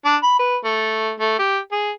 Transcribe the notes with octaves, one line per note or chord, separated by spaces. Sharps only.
D4
B5
B4
A3
A3
G4
G#4